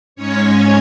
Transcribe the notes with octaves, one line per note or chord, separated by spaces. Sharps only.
G#2 G#3 C#4 C#5